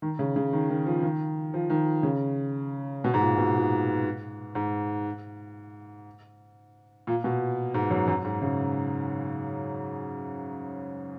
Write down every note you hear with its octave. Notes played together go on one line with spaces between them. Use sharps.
D#3
C#3
C#3
D#3
D#3
F3
D#3
F3
D#3
C#3
B2
G#2
A#2
B2
A#2
G#2
A#2
B2
G#2
F#2
F#2
G#2
C#3